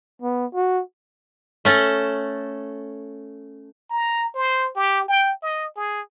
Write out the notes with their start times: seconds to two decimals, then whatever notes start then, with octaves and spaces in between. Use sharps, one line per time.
0.22 B3
0.55 F#4
1.65 A3 C#4 A4
3.90 A#5
4.35 C5
4.76 G4
5.08 G5
5.42 D#5
5.76 G#4